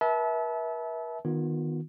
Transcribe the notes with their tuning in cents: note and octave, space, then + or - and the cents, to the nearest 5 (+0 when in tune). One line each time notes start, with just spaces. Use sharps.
B4 -45 E5 -25 A5 -30
D#3 +0 B3 +0 F4 +40